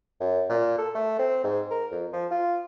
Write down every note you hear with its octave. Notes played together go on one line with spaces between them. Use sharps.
F#2
A#2
A4
A3
C4
G#2
A#4
F2
F3
F4